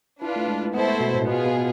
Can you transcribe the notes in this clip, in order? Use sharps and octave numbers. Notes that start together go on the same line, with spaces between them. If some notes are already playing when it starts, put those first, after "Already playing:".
D4 E4 F4 B4
A3
G#3
B3 E4 A4 C5
A3
B2
A2
B2 B3 F4 G#4
B2